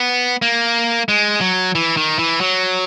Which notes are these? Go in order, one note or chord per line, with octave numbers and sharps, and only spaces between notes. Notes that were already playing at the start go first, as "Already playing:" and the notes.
Already playing: B3
A#3
G#3
F#3
E3
D#3
E3
F#3